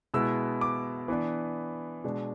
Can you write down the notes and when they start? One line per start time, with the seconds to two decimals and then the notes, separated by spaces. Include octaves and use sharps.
0.14 B2 G#3 B3 E4 E6
0.61 D6
1.08 E3 B3 D4
2.04 B2 G#3 D4